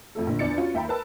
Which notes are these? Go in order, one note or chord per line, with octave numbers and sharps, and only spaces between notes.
F2 A3 A4
A#1 D3
E2 D4 A6 C#7
C#4 F4 F#4
D#2 E5 G5 A#5 B5
A#4 B4 A5 E6